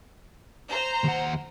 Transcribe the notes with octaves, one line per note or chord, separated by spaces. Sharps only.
C5 A#5
D#2 F#5